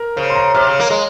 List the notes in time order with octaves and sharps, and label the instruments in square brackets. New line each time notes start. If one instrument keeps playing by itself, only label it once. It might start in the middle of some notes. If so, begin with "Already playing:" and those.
Already playing: [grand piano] A#4
[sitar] C#3 [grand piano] C5
[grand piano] C6
A#5
[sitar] C3 [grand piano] F6
[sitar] C#3
A#3
G#3